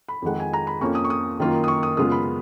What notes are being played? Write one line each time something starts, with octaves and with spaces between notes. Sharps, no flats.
B5
F2 D#3 G#3 F#5
G#5
A#5
B5
F2 F3 A#3 C#4 C#6
D#6
C#6
D#6
F#2 D#3 A#3 F4
D#6
C#6
D#6
F#2 C#3 G#3 B3 F4 D#6
B5